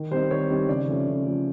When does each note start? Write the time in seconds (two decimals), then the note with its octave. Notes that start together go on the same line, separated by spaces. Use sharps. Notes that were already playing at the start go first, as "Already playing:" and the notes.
Already playing: D#3
0.11 G3 C4 D#4 C5
0.31 D#3 C#5
0.49 G3 C4 D#4
0.68 C#3 D5
0.87 F3 A3 C#4
1.07 C#3
1.25 F3 A3 C#4